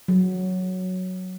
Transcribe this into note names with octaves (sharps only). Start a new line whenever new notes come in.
F#3